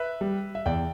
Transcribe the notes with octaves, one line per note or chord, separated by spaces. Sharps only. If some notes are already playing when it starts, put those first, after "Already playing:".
Already playing: B4 E5
G3
E5
E2 D5 G5